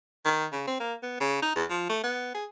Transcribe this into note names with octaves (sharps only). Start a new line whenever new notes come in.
D#3
C#3
C4
A#3
B3
C#3
D#4
E2
F3
A3
B3
G#4